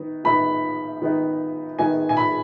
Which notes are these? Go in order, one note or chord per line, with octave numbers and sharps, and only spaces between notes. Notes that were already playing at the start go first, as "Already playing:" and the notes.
Already playing: D#3 B3 D#4
D#3 B3 D#4 B5
D#3 B3 D#4
D#3 B3 D#4 G#5
G#5
B5